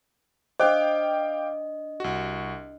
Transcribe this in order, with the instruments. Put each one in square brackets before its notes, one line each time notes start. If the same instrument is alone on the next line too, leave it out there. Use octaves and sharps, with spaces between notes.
[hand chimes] D4 D#5 [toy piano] C5 [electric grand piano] F5 G5 D6
[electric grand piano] C2 F#4